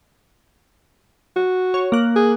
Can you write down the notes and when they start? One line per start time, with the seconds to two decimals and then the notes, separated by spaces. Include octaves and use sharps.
1.36 F#4
1.74 C#5
1.92 A#3 F#6
2.16 G#4